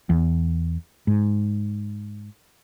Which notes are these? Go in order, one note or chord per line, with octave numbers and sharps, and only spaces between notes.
E2
G#2